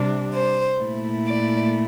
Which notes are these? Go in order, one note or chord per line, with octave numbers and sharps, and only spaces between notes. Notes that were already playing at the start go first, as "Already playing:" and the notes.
Already playing: C3 G3 D4
C5
A#2 A3 E4
D5